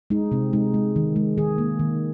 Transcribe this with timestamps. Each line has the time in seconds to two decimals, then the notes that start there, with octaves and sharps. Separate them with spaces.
0.10 G#3 D#4
0.32 C3 C4
0.53 G#3 D#4
0.74 G#3
0.96 D#3
1.16 G#3
1.38 D#3 G#4
1.58 A#3
1.79 D#3